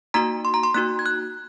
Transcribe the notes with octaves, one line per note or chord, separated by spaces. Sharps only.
A#3 D#4 F#4 A#5
C6
A#5
C6
A#3 D#4 F#4 F#6
G#6
F#6